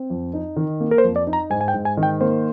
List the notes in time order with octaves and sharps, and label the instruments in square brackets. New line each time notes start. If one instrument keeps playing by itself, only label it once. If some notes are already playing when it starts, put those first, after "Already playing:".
Already playing: [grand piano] C4
F2
D#4
D#3
A#3
[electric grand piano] A#4
C5
[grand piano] F2
[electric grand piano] D5
[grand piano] D#4
[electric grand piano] A#5
[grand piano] G#2 [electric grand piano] G#5
[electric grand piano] G#5
G5
[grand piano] G#2
[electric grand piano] G#5
[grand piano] D#3
[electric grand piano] G5
[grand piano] A#3 [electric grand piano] C5